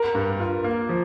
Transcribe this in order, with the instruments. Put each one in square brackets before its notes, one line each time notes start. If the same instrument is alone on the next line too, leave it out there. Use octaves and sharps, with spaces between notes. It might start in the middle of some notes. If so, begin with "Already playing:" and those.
Already playing: [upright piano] A#4
[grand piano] G2
F4
A#3
F3